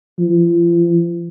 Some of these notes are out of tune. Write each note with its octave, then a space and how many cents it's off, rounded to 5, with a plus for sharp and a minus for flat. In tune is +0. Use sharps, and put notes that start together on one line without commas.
F3 -40